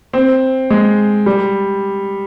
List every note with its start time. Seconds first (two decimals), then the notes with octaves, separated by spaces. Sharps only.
0.13 C4
0.70 G#3
1.26 G3